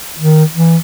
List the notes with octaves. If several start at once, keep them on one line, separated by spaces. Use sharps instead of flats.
D#3
E3